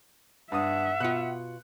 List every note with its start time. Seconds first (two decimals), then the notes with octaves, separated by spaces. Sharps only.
0.52 G2 E5 F#5 D#6
1.00 B2 F4 F#6 C#7